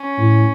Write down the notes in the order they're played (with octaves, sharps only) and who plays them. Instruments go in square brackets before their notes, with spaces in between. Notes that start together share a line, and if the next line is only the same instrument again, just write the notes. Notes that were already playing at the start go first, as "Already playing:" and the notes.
Already playing: [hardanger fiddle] C#4
[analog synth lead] A2